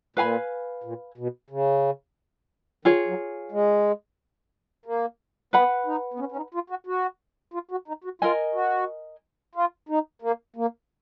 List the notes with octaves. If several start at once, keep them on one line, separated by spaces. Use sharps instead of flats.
A#2 B4 F5 G#5 B5
A#2
B2
C#3
D#3 F4 G#4 C#5
F#3
G#3
A#3
B3 B4 F#5 B5
D#4
B3
C#4
C#4
D#4
F4
F#4
F#4
F4
F#4
D#4
F#4
F4 A#4 D#5 G#5
F#4
F4
D#4
A#3
A#3